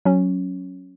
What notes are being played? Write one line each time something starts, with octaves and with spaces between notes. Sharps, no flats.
F#3 C#4